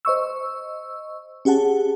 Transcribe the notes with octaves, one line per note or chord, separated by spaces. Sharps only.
C5 D#5 C#6 E6
C#4 G4 G#4 F#5 A5